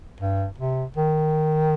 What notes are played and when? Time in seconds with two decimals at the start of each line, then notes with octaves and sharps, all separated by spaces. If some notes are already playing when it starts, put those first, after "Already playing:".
0.21 G2
0.58 C3
0.96 D#3